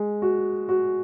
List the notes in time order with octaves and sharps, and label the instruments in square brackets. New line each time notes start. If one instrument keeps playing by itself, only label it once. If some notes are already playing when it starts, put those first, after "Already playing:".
Already playing: [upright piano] G#3
F#4
F#4